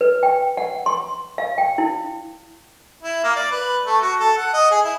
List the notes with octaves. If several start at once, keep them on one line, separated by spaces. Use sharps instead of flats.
B4
G5
F#5
C6
F5
G5
E4
E4
A#3
D5
B4
A3
F#4
A4
F#5
D#5
G#4
E4